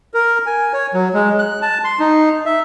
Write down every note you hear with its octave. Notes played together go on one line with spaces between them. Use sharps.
A#4
G#5
C#5
F#3
G#3
F#6
A5
C6
D#4
E5